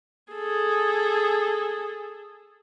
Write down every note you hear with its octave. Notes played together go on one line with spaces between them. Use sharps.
G#4 A4